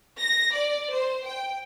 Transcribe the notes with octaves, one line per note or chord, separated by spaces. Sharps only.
A#6
D5
C5
G5